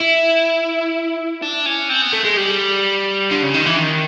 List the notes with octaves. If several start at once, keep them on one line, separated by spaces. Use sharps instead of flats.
E4
D4
C#4
C4
B3
A3
G#3
G3
D3
C#3
D#3
E3
D#3